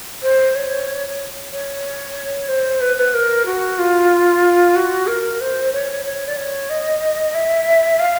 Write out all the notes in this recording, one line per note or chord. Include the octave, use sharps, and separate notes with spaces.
C5
C#5
C#5
C5
B4
B4
A#4
F#4
F4
F#4
A#4
C5
C#5
C#5
D5
C#5
D#5
E5
F5